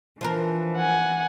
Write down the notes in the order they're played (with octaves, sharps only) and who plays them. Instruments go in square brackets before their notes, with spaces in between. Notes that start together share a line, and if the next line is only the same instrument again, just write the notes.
[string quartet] E3 [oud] F3 D4 A#4
[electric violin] F#5 G#5